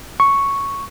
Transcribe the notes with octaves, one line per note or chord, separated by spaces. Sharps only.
C#6